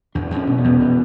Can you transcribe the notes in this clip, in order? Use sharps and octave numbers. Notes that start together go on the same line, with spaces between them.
E2 D4
E2
C#4
B2
B3
E2
B2